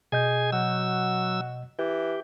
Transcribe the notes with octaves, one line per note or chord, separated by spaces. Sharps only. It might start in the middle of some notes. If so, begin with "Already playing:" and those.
B2 G#4 D#5 G#5 G6
F#3 F#4 E6
E3 G4